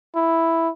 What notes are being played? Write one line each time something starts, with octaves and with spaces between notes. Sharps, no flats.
E4